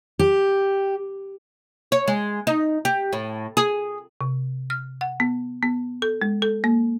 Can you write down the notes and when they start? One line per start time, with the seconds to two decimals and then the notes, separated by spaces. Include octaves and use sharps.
0.19 G4
1.92 C#5
2.08 G#3
2.47 D#4
2.85 G4
3.13 A2
3.57 G#4
4.21 C3
4.70 F6
5.01 F#5
5.20 B3
5.63 B3
6.02 A4
6.22 G#3
6.42 A4
6.64 A#3